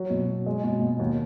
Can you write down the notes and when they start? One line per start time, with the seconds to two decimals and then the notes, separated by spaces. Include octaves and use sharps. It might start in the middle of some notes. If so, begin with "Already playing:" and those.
Already playing: F#3
0.10 B2
0.29 B2
0.46 G#3
0.64 B2
0.81 B2
0.99 D#2